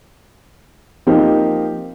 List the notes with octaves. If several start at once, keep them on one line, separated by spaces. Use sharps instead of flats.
F3 A#3 C4 D#4 G4 A#4